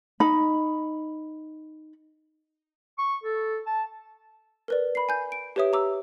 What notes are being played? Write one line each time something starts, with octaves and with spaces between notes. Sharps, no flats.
D#4 B5
C#6
A4
A5
A#4 B4 D5
B5 C7
G#5 G6
D7
G4 B4 C#5 E5 D#6
A#5 D6 E6